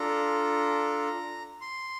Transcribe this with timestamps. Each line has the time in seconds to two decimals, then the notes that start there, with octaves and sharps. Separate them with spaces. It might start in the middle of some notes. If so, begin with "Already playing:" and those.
Already playing: D4 F4 A4 A#5
1.61 C6